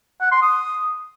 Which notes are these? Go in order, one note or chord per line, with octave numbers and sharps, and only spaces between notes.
F#5
C6
D#6